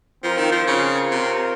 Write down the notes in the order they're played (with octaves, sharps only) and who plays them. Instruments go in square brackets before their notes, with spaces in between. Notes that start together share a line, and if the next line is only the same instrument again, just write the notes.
[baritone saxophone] F3 [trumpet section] C4 F4 A#4
[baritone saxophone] D#3
F3
C#3
C3